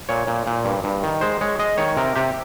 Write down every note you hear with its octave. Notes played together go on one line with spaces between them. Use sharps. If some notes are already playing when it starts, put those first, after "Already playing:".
A#2 C#5
A#2
A#2
G2
G2
D#3
G#3 C5
G#3 C#5
G#3 D#5
D#3 C#5
C3 A#4
C3 G4